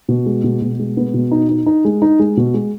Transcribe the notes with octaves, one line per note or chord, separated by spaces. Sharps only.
B2
G#3
B2
B2
G#3
B3
B2
D#4
D#4
D#4
G#3
D#4
G#3
B2
G#3